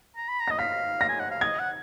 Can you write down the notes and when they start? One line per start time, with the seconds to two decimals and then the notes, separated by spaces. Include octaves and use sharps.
0.16 A#5
0.28 B5
0.40 A#5
0.48 D#5 A#6
0.59 F5 B6
1.01 A#6
1.09 G#5
1.20 F#5
1.31 F5
1.41 D#5 G#6
1.59 F#5